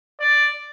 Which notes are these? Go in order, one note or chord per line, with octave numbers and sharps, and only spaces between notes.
D5